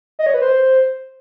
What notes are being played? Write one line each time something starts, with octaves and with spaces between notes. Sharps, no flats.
D#5
C#5
B4
C5